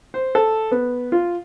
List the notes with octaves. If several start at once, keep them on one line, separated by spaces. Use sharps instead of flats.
C5
A4
B3
F4